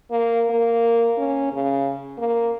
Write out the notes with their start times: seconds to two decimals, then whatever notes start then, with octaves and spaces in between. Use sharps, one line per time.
0.10 A#3
0.50 A#3
1.18 C#4
1.52 C#3
2.18 A#3